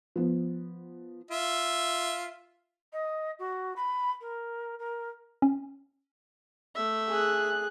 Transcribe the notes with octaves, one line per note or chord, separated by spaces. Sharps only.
F3 B3
F4 E5
D#5
F#4
B5
A#4
A#4
C#4
A3 E5
G#4 F#6